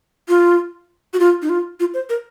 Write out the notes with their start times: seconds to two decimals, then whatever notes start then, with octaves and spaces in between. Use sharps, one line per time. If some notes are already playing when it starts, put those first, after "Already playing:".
0.28 F4
1.13 F#4
1.19 F4
1.42 D#4
1.49 F4
1.80 F4
1.94 C5
2.09 A#4